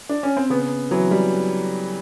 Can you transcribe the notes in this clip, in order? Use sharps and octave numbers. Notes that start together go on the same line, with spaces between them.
D4
C#4
C4
C#3 B3
E3 F#3
G3